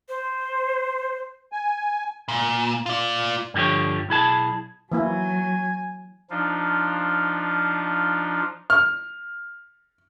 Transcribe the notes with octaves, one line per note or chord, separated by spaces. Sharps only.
C5
G#5
A#2
F4 D5
G2 D3 F3 G4 C#5
B1 E4 G#4 A5
E3 F#3 A#3 E4 G#5
F3 D4 D#4 F4
F6